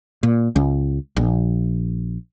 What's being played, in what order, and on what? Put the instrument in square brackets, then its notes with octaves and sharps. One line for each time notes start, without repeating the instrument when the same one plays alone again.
[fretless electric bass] A#2
C#2
A#1